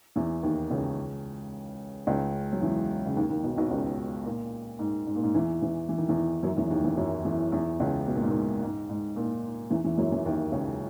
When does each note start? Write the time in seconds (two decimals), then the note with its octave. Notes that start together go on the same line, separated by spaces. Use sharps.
0.16 E2 E3
0.43 D#2 D#3
0.70 C#2 C#3
2.07 C#2 C#3
2.52 F#3
2.61 E2 E3
3.06 C#3
3.16 D#2 D#3
3.29 D#2 D#3
3.43 B1 B2
3.58 B1 B2
3.71 C#2 C#3
4.25 A#2
4.79 G#2
5.07 G#2
5.15 A#2
5.23 G#2
5.34 E2 E3
5.62 E2 E3
5.89 E3
5.98 D#3
6.08 E2 E3
6.43 F#2 F#3
6.50 D#3
6.57 E2 E3
6.70 D#2 D#3
6.84 E2 E3
6.97 F#2 F#3
7.25 E2 E3
7.52 E2 E3
7.80 C#2 C#3
8.07 B2
8.15 A#2
8.22 G#2
8.29 A#2
8.62 G#2
8.89 G#2
9.16 A#2
9.70 E2 E3
9.84 E2 E3
9.98 F#2 F#3
10.12 E2 E3
10.25 D#2 D#3
10.52 C#2 C#3